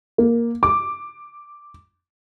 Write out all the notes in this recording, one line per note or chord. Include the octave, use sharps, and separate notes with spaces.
A#3
D6